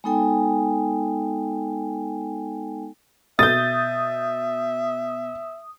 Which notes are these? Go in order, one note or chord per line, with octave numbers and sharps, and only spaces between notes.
G#3 B3 D#4 A4 G5 G#5
B2 E5 D#6 G6 A6